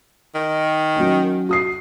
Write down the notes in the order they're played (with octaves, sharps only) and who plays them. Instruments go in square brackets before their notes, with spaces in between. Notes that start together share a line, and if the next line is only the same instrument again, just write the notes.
[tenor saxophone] D#3
[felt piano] F#3 C#4
F#4 D#6 C7